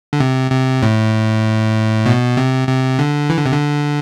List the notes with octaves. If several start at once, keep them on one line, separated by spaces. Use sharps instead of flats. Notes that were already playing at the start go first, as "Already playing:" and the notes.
D3
C3
C3
A2
B2
C3
C3
D3
E3
D3
C3
D3